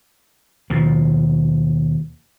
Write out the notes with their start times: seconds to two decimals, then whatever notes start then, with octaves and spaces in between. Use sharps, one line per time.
0.70 D#2 B2 F3